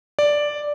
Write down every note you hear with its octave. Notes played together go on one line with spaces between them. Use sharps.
D5